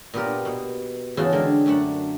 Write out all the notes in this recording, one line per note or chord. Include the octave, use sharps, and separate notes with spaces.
A#2 B3 G4 A#4
B2
E2 C#3 F#4 A4 A5 C6
D3 G#3 C4 A#4
F#2 A3 D4 F#5